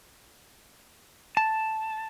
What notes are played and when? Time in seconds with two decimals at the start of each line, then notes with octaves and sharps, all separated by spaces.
1.37 A5